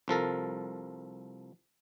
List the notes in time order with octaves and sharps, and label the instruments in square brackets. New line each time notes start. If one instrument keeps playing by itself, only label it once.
[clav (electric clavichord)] C2 F3 A4 A#4